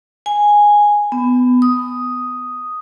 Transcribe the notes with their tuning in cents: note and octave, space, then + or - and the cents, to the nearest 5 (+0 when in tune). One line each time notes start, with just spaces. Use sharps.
G#5 -5
B3 +20
D#6 +0